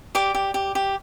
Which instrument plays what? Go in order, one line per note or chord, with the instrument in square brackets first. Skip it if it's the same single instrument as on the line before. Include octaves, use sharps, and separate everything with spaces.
[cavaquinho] G4 D5 D6
G4
G4
G4